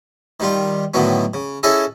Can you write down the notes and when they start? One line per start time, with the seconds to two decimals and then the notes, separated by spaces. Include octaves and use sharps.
0.40 D#3 G3 F4
0.94 A2 D3 D#3 F#3 B3
1.34 C#3
1.63 C#4 E4 G#4 A4 D#5